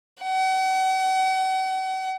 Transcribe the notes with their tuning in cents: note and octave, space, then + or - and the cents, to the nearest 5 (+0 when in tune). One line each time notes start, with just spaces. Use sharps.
F#5 +40